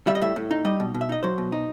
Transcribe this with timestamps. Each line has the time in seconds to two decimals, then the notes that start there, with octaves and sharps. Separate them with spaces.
0.07 G3 E5
0.15 D#5
0.21 A2 E5
0.36 A2
0.51 D#4
0.65 G3 D#5
0.80 B2
0.94 B2
1.01 E5
1.09 D#4 D#5
1.23 F#3 C5
1.38 B2
1.52 D#4